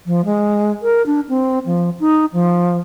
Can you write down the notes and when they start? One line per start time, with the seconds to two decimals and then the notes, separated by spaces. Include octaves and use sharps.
0.06 F3
0.25 G#3
0.82 A#4
1.06 D4
1.29 C4
1.66 F3
2.00 D#4
2.33 F3